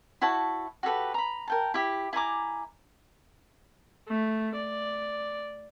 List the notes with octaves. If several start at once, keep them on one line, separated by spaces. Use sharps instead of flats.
E4 F#4 C#5 A5
F#4 G4 A4 B4
A#5 B5
A#4 G5 A5
E4 G4
E4 G#5 A#5 D6
A3
D5